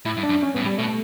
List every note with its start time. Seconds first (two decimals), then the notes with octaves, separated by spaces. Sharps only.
0.05 A2 E4
0.17 G2
0.23 D4
0.29 F#2
0.43 C#4
0.54 G2 B3
0.61 A2
0.66 G3
0.78 B2 A3